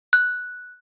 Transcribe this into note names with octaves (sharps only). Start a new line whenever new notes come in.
F#6